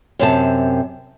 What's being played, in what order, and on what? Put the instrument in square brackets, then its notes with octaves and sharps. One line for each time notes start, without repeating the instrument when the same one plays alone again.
[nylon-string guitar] F#2 C3 A5